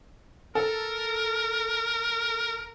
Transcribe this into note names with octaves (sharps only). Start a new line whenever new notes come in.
A4 A#4